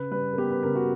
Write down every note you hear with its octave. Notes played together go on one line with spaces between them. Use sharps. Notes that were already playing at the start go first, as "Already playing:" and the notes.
Already playing: C#3 B4
G3 B4
A#4
B3 G4
B4
C#3 A#4
F#4